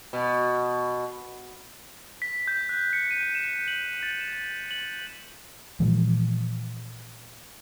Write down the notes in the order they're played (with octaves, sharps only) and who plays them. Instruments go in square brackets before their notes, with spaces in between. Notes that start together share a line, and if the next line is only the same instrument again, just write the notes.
[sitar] B2
[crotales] B6
G6
F#6
C#7
D#7
E7
F#7
A6
E7
F#7
[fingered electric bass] A#2 E3 F3 G#3